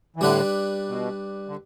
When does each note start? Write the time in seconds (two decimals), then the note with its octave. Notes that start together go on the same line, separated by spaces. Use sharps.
0.16 E3
0.21 A2 D3 G3 D4 B4
0.89 B2
1.48 D3